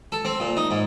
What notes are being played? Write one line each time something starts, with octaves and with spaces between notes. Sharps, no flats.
A4
C4
A#2
D#4
G#2